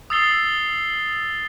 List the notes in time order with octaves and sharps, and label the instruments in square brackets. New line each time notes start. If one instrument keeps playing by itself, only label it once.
[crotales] D#6 E6 A6 C7 G7